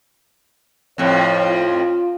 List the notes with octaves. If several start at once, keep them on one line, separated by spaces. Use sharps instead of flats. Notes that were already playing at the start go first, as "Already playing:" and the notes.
F2 A2 F3 C#5
F4